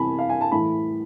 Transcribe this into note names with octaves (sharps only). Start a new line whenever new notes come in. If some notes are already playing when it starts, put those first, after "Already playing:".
Already playing: C3 E3 G#5 A5 B5
F5
G#5
A5
A2 E3 B5